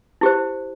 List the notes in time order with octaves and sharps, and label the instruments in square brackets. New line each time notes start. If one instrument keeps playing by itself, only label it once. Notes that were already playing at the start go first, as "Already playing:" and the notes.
[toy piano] E4 G4 C5